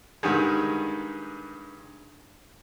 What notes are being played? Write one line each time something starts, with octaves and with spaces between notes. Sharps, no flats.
G2 D3 D#3 G3 G#3